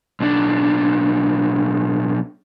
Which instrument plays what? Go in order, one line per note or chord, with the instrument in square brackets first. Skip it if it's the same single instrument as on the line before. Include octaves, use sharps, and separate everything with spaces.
[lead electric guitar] B1 D4